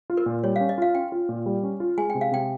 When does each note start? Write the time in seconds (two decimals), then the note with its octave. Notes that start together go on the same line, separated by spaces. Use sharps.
0.10 F4
0.17 A#4
0.26 A#2
0.44 G3 C#5
0.56 C#4 F5
0.69 D#5
0.78 F4 F5
0.95 C#4 G5
1.12 F4
1.29 A#2
1.46 G3
1.63 C#4
1.80 F4
1.98 G#3 G#5
2.10 G5
2.15 C3
2.21 F5
2.32 C3 G5